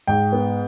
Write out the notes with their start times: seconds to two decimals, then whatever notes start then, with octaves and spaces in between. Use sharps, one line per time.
0.07 G#2 G5
0.32 B3